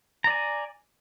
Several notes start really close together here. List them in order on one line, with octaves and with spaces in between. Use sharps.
A#5 D5 G#5